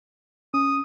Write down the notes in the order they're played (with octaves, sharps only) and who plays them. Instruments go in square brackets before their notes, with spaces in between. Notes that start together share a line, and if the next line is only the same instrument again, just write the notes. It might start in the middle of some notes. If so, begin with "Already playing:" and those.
[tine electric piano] C#4 [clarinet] D#6